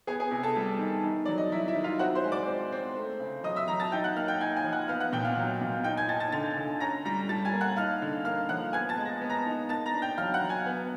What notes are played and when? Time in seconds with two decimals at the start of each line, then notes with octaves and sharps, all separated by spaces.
0.07 B3 G#4 G#5
0.20 G#4 G#5
0.31 C3
0.43 A4 A5
0.56 G3
0.79 D#3
1.03 D#3
1.26 F#3 D5
1.38 D#5
1.52 F#3 E4 E5
1.68 E4 E5
1.76 D#3
1.84 F4 F5
1.99 C4 F#4 F#5
2.15 C5 C6
2.25 G#3
2.32 D5 D6
2.47 C4
2.72 C4
2.96 A3
3.20 C#3
3.44 F#3 D#5 D#6
3.56 E5 E6
3.68 F#3 A#5 A#6
3.80 A5 A6
3.92 D#4 G5 G6
4.04 F#5 F#6
4.16 A#3 F5 F6
4.28 G5 G6
4.40 D#4 G#5 G#6
4.56 G#5 G#6
4.64 F3
4.73 F#5 F#6
4.88 B3 F5 F6
5.00 F#5 F#6
5.13 A#2 G5 G6
5.25 F5 F6
5.37 F#3
5.61 A#2
5.84 D#4 G5 G6
5.97 G#5 G#6
6.08 D#4 A5 A6
6.20 A5 A6
6.32 D3 A5 A6
6.57 D3
6.80 C#4 A#5 A#6
7.05 G3 A#5 A#6
7.29 G3 A5 A6
7.45 G#5 G#6
7.53 A#3
7.61 F#5 F#6
7.77 D#4 F5 F6
8.02 D3
8.25 A#3 F5 F6
8.49 F3 F#5 F#6
8.73 B3 G#5 G#6
8.89 A5 A6
8.98 G#3
9.06 A#6
9.21 B3
9.29 A#5 A#6
9.46 D#4
9.69 A#3 A5 A6
9.86 A#5 A#6
9.94 D4
10.02 G5 G6
10.18 F#3 F5 F6
10.34 F#5 F#6
10.42 F#3
10.49 G#5 G#6
10.66 B3